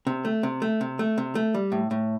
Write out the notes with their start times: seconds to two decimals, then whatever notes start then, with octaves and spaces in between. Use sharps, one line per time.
0.07 C3
0.25 A3
0.43 C3
0.62 A3
0.81 C3
0.99 A3
1.18 C3
1.35 A3
1.54 G3
1.72 A2
1.91 A2